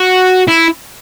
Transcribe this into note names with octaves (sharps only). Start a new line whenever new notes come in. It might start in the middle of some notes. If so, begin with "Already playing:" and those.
Already playing: F#4
E4